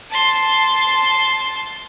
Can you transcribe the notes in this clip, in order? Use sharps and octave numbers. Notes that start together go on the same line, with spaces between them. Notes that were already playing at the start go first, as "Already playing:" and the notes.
A5 C6